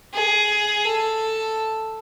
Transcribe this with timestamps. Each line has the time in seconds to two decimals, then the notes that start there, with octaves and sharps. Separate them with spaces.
0.14 G#4
0.85 A4